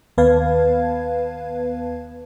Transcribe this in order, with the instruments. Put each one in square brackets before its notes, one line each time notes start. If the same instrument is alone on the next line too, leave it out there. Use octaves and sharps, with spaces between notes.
[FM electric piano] D#2 B3 B4 F5 A5 G#6